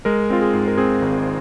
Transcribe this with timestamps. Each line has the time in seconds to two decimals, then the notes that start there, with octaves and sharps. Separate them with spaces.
0.05 G#3 A#4
0.30 C4 F4
0.42 G#4
0.54 G#2
0.68 A#4
0.77 C4 G#4
1.02 G#1